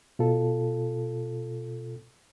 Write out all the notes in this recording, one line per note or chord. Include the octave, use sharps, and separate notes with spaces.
B2 F4 A4